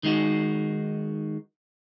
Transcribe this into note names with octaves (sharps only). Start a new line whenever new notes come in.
D#3 G#3 D#4 F#4